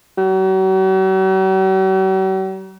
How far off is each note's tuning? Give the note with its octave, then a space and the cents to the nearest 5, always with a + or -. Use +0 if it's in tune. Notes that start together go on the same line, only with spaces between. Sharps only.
F#3 +45